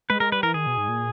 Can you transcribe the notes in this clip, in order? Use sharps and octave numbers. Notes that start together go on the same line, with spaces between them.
G#3 B4
G#3 A#4
G3 B4
E3 A#4
D#3 G#4
B2
G#2
A#2